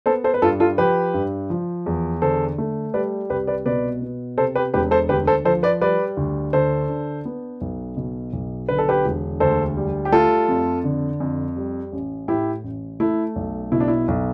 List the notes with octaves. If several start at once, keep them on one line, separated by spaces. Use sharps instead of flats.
B3 A4 C5
A4 C5
B4
G2 F4 A4
F4 A4
F3 G4 B4
G2
F3
E2
D3 A4 C5
A3
G3 B4 D5
C2 G4 B4
B4 D5
B2 B4 D5
B3
C3 A4 C5
G4 B4
E1 G4 B4
A4 C5
D2 G4 B4
A4 C5
F3 A4 C5
B4 D5
G3 B4 D5
D2
D3 A4 C5
D4
B3
B1
B2
B1
D3 B4
A4
G4 B4
E1
D2 A4 C5
G3
G4
A3 F4 A4
F2
D3
F2
G3
A1
A2 E4 G4
A1
A3 E4
B1
B2 E4
D4
E4
B1